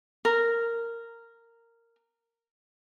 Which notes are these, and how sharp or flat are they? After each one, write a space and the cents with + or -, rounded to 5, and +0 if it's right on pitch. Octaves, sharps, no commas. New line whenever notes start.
A#4 -10